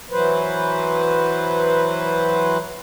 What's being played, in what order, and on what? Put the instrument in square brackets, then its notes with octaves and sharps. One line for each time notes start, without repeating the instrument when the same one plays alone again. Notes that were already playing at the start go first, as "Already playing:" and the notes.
[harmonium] E3 F#3 B4 C5